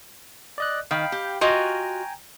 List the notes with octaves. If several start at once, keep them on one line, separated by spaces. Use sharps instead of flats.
D5 D#5 F#6
D#3 F5 G5 B5
G4
F4 F#4 D#5 G5 G#5 A#5